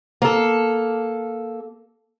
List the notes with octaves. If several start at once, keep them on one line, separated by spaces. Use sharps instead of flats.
A#3 A4